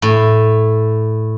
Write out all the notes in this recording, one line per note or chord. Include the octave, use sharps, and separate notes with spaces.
A2